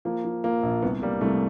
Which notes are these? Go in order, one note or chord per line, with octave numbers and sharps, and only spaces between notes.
F3 A#3
F3
F3 A#3
A#1
C2 B3
G3 A#3
C2 A3